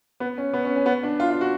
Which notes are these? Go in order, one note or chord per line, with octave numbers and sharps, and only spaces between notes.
B3
C#4
B3
C#4
C#4
B3
D4
F4
F4
F#4